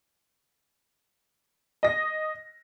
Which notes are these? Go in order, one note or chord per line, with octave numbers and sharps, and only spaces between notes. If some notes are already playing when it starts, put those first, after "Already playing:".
D#5 A#6